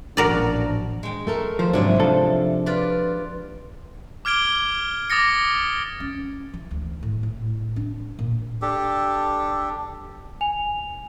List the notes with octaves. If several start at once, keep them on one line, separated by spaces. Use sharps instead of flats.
A1 A#2 F3 D4 F#4 A#4 D5
G#3 G5
A3 A4 A#4
F3 C5
G#2 C3 F#3 D4 E4 G#5
F3 D4 A4
F4 B4 D5
D6 F6 G#6 D7 G7
D6 D#6 A6 A#6 C#7
C#4
E3
D2
A2
A2
D4
A#2
D4 G4 A4
G#5 F7